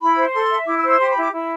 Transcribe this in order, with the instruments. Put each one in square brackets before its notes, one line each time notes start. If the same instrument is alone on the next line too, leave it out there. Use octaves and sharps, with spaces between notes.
[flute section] E4 [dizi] B5
[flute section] C5
[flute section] A4 [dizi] C6
[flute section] E5
[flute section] E4 [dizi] D6
[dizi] E6
[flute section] C5
[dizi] E6
[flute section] G4 [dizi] C6
[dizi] B5
[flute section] E4 [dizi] D6
[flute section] E4